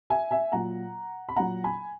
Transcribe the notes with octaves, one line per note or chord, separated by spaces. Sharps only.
E5 G#5
E5 G#5
A#2 F#3 F#5 A#5
B5
A#2 F#3 F#5 A#5
G#5 B5